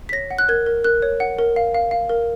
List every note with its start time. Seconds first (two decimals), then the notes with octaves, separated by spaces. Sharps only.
0.09 B6
0.12 C#5 A#6
0.31 F#5
0.39 F#6
0.49 A#4 G#6
0.66 A#4
0.84 A#4 F#6
1.02 C#5
1.20 F#5
1.39 A#4
1.56 F5
1.75 F5
1.91 F5
2.09 A#4